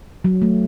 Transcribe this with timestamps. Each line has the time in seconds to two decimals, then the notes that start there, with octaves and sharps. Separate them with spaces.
0.24 F#3
0.42 A3